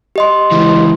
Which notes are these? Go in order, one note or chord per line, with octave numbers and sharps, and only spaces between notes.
G4 D#5 C6
C#2 E3